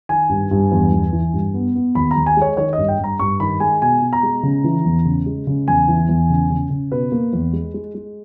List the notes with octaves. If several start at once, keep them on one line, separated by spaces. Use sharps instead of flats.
D#3 G#5
G2
G2
E2
E2
E3
G2
B3
B3
D#2 B5
A#5
D#2
G#5
G#3 C#5
D#3 C#5
D#5
G2
G5
G2 A#5
G2 C#6
D#3 B5
G#3 G#5
B2 G#5
B2
A#5
G#3
C#3
E3
E2
C#3
G#3
C#3
E2 G#5
E3
E2
C#3
C#3
C#3
B2 B4
A#3
E2
G#3
G#3
G#3